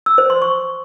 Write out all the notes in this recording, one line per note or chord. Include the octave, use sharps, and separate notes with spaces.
E6
C5
C6
C#6